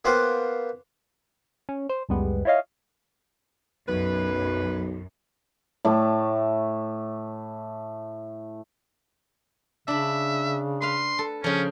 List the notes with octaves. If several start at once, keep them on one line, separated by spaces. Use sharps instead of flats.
A#3 B3 F4 C5 F#5 G5
C#4
C5
C#2 F#2 G3 G#3 B3
E4 F4 C#5 D#5 F5
B1 F#2 B4
A2 A3 D6
C#3 D4 E5 B5
B4 F5 C6
A4
C#3 F3 C#4